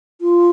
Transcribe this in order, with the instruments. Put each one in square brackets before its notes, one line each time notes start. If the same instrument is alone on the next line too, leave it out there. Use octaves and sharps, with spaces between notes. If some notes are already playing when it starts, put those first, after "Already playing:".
[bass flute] F4